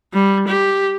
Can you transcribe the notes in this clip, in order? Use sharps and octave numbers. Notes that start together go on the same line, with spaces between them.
G3
G4